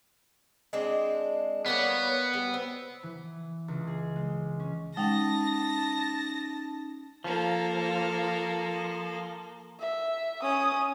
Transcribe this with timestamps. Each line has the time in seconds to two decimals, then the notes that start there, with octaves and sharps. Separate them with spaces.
0.73 G#3 C4 D4
1.66 G3 A#3 B3 C#5
2.34 G3
2.54 C4
3.03 E3
3.68 C#2
3.87 G#4
4.16 G#3
4.60 C#4
4.97 G#3 C#4 D#4 G5 A5 A#6
7.24 F3 A#3 A4
9.80 E5
10.42 C#4 D#6